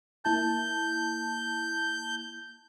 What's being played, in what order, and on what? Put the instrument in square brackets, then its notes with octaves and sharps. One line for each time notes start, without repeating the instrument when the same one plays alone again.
[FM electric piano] A#3 E4 A5 [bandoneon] G6